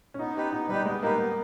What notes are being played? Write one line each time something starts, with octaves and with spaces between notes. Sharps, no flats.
C#4
B3 D#4
D#4 G4 B4
B3 D#4
G3 D#4 G4 B4
G#3 B3
A#3 D#4 G4 B4
B3